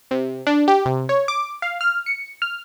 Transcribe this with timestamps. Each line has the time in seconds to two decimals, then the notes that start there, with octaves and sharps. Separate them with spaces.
0.11 C3
0.47 D4
0.68 G4
0.85 C3
1.09 C#5
1.28 D6
1.62 F5
1.81 F6
2.06 C#7
2.42 F6